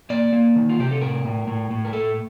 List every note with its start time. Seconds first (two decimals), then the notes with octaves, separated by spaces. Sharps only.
0.10 A#3 D5
0.33 A#3
0.56 D#3
0.69 F4
0.79 C3 G4
0.91 A4
1.01 A2 A#4
1.25 A2
1.47 A2
1.70 A2
1.85 A#4
1.93 A3 A4